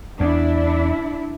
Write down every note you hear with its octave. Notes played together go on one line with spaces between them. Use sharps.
E2 D4 E4